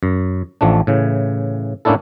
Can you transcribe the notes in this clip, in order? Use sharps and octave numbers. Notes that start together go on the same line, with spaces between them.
F#2
A1 F3 A3 D4
A2 C#3 E3
A2 A#3 C#4 D4 E4 A4